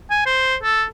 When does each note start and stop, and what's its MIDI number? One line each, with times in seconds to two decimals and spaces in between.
0.10 0.22 80
0.26 0.56 72
0.63 0.84 69